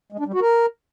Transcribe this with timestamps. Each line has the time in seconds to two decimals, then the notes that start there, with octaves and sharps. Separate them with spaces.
0.12 G#3
0.20 D4
0.27 G3
0.34 F#4
0.41 A#4